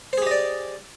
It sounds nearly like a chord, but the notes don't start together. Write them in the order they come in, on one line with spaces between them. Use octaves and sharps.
C5 G#4 G4 D#5 D5